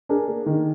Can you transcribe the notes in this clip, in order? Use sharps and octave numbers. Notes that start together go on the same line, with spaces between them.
D4 G#4 A#4
A#3
D#3